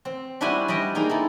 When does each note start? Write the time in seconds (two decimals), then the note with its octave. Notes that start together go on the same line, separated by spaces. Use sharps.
0.05 C4
0.41 G3 D4 E4 F#4 G4 G#5
0.68 G3 D4 D#5 G5
0.95 A#3 D#4 F4 G#4
1.09 E4 A4